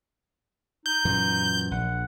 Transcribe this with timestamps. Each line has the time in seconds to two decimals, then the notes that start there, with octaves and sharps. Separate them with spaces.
0.86 D#4 G6
1.05 F#2 A#2 E3
1.71 A#1 F#5